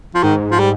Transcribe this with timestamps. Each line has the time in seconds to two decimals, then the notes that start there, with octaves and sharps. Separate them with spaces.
0.14 F3
0.23 G#2 D#3
0.51 F3
0.59 G3